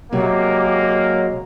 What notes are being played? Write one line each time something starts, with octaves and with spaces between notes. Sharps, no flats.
C3 F#3 G#3 A#3 G4